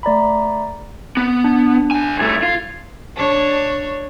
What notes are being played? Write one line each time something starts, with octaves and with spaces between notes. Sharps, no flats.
A3 D5 A#5 B5
B3
D4
C#2 G#5
C2 A3 G#6 A6
F4
D4 C#5